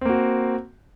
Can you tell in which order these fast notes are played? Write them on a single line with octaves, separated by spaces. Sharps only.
C4 A#3 F#4